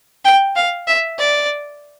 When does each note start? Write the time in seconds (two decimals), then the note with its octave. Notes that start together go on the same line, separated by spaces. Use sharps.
0.25 G5
0.56 F5
0.87 E5
1.19 D5